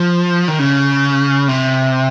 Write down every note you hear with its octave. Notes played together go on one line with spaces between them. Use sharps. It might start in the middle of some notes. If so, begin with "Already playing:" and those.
Already playing: F3
D#3
C#3
C3